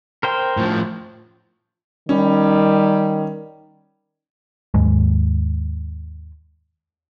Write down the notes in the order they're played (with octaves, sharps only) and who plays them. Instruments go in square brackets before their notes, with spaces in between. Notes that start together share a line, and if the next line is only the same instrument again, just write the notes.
[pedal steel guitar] A#4 C5 G5
[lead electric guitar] A2 F3
[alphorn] D#3 [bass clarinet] G3 [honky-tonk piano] C#4
[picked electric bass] D#2 G#2 G#3